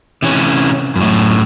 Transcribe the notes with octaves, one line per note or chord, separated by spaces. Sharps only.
C3 E3 C#4
F#2 A2